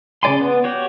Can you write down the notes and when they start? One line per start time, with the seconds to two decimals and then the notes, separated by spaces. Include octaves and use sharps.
0.23 C#3 C4 D5 G#5 C6
0.41 B3
0.64 F#4 G4 C#5